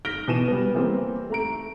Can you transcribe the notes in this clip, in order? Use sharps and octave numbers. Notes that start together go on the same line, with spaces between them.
F6 A#6 B6 D7 G7
B2 E3 D#7 E7
G3 B3
E3 G3 A#3 C4
A3 A#5 D7